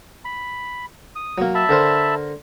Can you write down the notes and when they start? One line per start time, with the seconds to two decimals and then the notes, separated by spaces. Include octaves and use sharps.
0.25 B5
1.15 D#6
1.38 F#3 A#3
1.55 E5 A5 B5
1.69 D3 A#4 C5